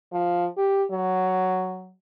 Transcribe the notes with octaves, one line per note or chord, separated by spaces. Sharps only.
F3
G4
F#3